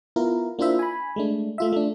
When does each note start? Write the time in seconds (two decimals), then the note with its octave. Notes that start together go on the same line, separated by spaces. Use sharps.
0.16 B3 E4 F4 A#4
0.59 A#3 D4 E4 F4 C5 E5
0.79 G#5 B5
1.16 G#3 A3 D4
1.58 A3 F4 E5
1.72 A3 D4